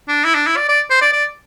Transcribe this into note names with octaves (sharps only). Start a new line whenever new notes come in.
D4
E4
D4
E4
D5
D5
C5
D5
D5